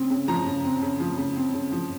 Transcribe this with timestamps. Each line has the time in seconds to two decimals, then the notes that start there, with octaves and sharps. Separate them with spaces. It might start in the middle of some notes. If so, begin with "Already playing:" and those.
Already playing: C#3 C4
0.10 C#3
0.28 F3 A#5
0.46 C#3
0.64 C4
0.82 C#3
1.00 F3
1.18 C#3
1.36 C4
1.54 C#3
1.72 F3